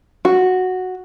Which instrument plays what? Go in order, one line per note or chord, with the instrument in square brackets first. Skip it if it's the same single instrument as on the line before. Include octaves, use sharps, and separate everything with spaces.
[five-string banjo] F#4